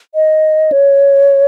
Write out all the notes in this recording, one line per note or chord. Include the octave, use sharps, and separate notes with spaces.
D#5
C#5